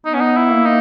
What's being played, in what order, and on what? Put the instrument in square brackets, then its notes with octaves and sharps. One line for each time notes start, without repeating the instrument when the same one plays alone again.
[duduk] B3 [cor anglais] D#4
[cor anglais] C#4
D#4
E4
[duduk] A#3
[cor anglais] D#4